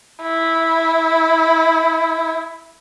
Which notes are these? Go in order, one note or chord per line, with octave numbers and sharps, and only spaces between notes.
E4